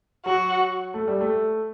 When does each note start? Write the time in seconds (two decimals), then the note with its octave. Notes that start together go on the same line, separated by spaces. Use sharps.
0.25 F#3 F#4
0.94 A3
1.08 G3
1.21 A3